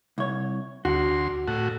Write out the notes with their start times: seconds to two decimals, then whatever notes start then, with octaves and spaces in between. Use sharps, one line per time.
0.18 C2 C#5
0.85 D2 F#4 C6
1.48 A2 F#4